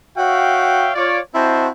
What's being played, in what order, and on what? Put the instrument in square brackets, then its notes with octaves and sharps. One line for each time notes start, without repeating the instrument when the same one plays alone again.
[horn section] F#4 C#5 E5 F5 G5
F4 C#5 D5
C4 E4 F#4 C5 D#5 A5